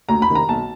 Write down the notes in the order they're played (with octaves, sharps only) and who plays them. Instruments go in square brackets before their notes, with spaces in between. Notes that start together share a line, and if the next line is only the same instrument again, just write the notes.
[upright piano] D2 A#5
B5
C3 D#3
A#5
B1 A5